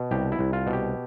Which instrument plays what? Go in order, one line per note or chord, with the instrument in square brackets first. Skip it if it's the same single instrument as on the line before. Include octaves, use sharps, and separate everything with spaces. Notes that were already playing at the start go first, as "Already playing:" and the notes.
Already playing: [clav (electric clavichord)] B2
C2 G4
E4
C2
F4
B2
G4